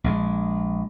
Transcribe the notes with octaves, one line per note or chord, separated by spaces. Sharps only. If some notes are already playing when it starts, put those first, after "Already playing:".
A#1 G#3